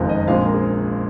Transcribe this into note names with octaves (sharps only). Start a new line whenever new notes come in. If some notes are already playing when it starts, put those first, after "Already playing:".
Already playing: F#1 F2 D#3 G#3 F5
D#5
A#1 A#2 G#3 C4 F5
A#4
G#4